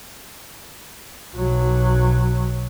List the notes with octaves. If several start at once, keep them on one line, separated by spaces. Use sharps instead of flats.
B1 F#3